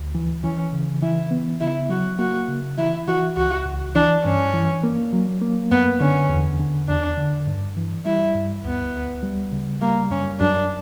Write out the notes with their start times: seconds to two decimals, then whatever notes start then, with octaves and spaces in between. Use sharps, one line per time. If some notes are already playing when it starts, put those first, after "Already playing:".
Already playing: D2
0.15 E3
0.44 E3 C#4
0.73 C#3
1.02 E3 E4
1.31 B3
1.61 C#3 E4
1.89 F#3 F#4
2.19 A#3 F#4
2.48 C#3
2.78 E3 E4
3.07 E3 F#4
3.37 C#2 F#4
3.66 C#2
3.95 E3 D4
4.24 G2 C#4
4.54 E3
4.84 A#3
5.13 F#3
5.41 A#3
5.71 F#2 B3
6.01 D3 C#4
6.29 E2
6.59 D3
6.89 E2 D4
7.17 D3
7.47 G2
7.77 E3
8.06 G3 E4
8.35 G2
8.64 D2 B3
8.94 D2
9.23 G3
9.52 C#3
9.81 G3 A#3
10.11 F#2 C#4
10.40 F#2 D4